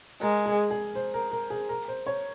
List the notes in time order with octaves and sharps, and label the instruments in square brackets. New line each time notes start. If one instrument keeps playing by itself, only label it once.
[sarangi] G#3 [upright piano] A#4
[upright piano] G#4
G#4
C5
A#4
A#4
G#4
A#4
C5
C#5